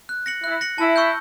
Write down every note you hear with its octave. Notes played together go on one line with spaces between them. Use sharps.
F#6
A#6 C#7 F#7
E4 F#6
A#6 C#7 F#7
E4 A5
C#6 E6 G6